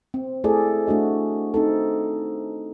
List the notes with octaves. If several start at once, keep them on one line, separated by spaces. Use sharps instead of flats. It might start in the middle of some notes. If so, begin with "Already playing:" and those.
C4
A3 E4 G#4 A4 D5
A3 D4 F#4 D#5
C4 D#4 A4